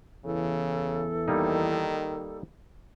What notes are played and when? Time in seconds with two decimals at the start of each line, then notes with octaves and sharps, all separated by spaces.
0.25 E2 C#3 E3 A4
1.28 D#3 G3 A#3 D#4